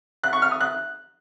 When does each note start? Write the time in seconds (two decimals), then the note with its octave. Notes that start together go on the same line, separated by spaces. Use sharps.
0.23 F#6
0.33 C#6
0.42 F6
0.51 D#6
0.60 F#6